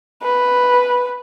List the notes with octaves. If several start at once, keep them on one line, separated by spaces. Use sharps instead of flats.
B4